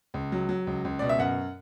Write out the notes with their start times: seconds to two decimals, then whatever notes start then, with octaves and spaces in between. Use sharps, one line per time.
0.14 C#2
0.32 F#3
0.49 F#3
0.67 C#2
0.85 C#2
0.99 B2 D5
1.09 E5
1.18 F#2 F#5